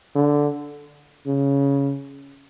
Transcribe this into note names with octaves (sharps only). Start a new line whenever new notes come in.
D3
C#3